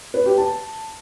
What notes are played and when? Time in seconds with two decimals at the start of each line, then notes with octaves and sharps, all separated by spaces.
0.14 B4
0.26 G4
0.38 A5